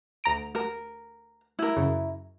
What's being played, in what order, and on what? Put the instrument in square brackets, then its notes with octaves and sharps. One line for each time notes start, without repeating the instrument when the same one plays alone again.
[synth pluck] D2 A#5 D7
[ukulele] A#4
E4 A#4
[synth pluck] F#2 C#3